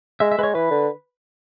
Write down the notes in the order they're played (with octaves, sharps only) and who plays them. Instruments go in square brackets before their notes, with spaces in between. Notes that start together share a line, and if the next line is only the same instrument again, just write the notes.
[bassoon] G#3 [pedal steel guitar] E5
[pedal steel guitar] E5
[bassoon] G#3 [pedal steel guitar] B4
[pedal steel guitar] C#5
[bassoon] E3 [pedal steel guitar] B4
[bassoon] D3